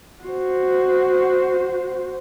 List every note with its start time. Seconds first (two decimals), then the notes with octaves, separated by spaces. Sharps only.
0.24 F#4 C5